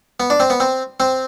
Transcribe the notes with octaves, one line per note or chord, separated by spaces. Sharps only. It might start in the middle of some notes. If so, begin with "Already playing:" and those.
B3
D4
C4
B3
C4
C4